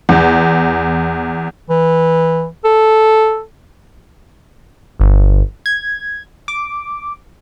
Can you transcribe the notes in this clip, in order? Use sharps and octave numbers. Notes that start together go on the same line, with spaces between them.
E2
E3
A4
G1
G#6
D6